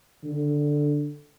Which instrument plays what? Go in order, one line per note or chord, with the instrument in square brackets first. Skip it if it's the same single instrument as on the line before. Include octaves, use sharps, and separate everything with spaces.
[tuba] D3